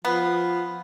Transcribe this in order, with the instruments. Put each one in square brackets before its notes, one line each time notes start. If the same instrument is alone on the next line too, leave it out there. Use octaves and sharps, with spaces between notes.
[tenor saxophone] F3 [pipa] B3